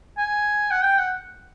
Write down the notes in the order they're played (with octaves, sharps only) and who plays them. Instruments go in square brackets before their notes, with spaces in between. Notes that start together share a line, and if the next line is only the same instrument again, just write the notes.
[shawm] G#5
F#5
G5
F#5